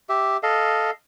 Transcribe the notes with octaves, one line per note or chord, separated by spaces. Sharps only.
G4 E5
A4 D#5 F5